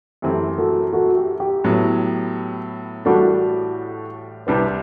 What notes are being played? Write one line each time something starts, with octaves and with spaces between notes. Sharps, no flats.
F#2 E3 A3 C4 G4
F#4 A4
F#4 A4
G4
G4
A2 F#3 B3
A1 A2 G3 D4 F#4 A4
C2 C3 G3 D4 G4 B4